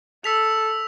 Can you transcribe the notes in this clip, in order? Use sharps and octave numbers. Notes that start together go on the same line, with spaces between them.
A4 E6 B6 F7